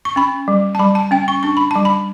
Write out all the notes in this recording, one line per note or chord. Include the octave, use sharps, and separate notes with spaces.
C#6
C#4 B5
G3
A5
G3 B5
A5
C#4 G5
C#6
D4 C#6
B5
G3 A5
B5